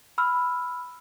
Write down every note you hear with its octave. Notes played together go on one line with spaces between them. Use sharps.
B5 E6 F6